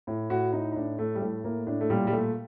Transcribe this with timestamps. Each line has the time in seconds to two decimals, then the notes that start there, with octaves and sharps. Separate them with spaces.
0.07 A2
0.30 A2 F#4
0.53 A2 D#4
0.72 D#4
0.76 A2 D4
0.98 A2 A3
1.15 G3
1.21 A2 A3
1.44 A2 A#3
1.67 A2 D4
1.81 A3
1.90 A#2 G3
2.07 G3
2.13 A#2 A3